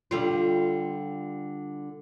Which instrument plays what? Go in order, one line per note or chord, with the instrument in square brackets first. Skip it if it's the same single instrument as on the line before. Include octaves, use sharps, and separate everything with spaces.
[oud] D3 G3 F4